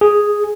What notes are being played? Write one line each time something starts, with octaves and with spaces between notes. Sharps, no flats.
G#4